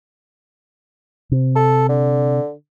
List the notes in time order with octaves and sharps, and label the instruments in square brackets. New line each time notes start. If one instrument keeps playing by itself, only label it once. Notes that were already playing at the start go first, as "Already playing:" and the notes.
[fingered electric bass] C3
[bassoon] A4
D3